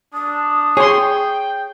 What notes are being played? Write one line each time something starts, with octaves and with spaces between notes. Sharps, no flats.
D4 D#6
G#4 C#5 G5 C6